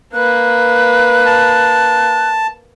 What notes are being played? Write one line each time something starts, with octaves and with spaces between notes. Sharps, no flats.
A#3 B4 F#6
A5